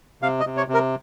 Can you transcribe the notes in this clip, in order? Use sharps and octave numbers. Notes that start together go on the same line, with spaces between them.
C3 F5
D#5
C3
C#5
C3
A#4